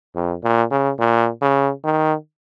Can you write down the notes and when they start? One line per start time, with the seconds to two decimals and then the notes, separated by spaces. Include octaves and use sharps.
0.15 F2
0.44 A#2
0.71 C#3
1.00 A#2
1.42 C#3
1.84 D#3